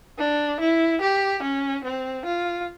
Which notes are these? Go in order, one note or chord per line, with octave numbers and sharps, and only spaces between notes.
D4
E4
G4
C#4
C4
F4